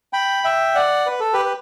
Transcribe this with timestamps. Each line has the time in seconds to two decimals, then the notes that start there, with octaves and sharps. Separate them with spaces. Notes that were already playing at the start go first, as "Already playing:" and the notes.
0.13 G5 B5
0.44 E5 G5
0.75 D5 F#5
1.06 B4
1.20 A4
1.34 G4 B4
1.45 B4